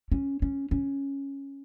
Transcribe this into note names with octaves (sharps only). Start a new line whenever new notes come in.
C#4
C#4
C#4